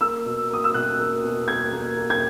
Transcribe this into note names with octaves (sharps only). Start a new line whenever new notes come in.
A#3 E6
B2
A#3 D#6
E6
B2 F#6
A#3
B2
A#3 G#6
A#3
A#3
G#6